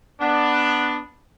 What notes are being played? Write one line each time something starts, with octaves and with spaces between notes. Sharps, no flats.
B3 D4